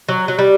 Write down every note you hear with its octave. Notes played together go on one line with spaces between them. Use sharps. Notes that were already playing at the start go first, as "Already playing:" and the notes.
F#3
F#3
G3